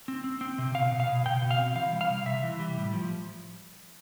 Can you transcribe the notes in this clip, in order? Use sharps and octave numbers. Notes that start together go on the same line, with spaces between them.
C4
C4
C4
C3
B2 F5
B2
F5
B2
B2 G5
B2
F5
C4
E3 F5
G3
F5
C3
C3 E5
E3
G3
A2
F3